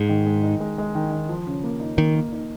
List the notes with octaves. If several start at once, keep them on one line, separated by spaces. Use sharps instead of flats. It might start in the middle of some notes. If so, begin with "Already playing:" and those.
Already playing: G#2 G#4
D#3
G#3
D#4
G#3
G#3
D#3
D#3
F3
C#3
A#3
D#4
D#3 A#3
A#3
D#4